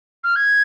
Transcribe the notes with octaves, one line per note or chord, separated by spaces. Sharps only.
F6
G#6